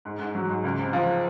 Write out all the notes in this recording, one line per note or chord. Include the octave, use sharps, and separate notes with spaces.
G#2
G#2
F#3
G#2
C#2
C3
F3